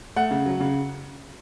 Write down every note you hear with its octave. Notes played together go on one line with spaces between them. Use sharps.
A3 F#5
C#3
F#3
C#3